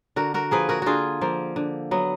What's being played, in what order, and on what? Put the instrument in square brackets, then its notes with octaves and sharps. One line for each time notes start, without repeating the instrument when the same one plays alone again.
[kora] D3 F#4 A#4
F#4 A#4
F3 A#3 G#4 B4
F#4 A#4
D3 F4 F#4 G#4
F3 A#3
D3
F#3 B3